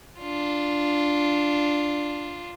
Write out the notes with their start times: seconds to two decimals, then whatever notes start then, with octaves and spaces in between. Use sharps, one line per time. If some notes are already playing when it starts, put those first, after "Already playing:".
0.20 D4 F4